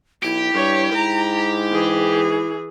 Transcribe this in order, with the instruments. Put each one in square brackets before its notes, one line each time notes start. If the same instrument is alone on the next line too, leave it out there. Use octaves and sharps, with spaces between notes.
[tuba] B1 [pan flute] E4 [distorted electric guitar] G4
[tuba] G2 [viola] C#5
[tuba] G#2 [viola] A#5
[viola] E3 G#4